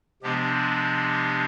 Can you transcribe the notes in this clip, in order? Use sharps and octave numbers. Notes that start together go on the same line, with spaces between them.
C3 F3 G#3 B3 D4 G4